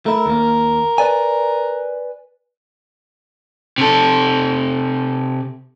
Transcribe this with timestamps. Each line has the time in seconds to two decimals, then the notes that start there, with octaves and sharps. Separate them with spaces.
0.06 A3 E4 A#4
0.26 D#2 A#3
0.98 B4 D5 G#5
3.78 C3 A4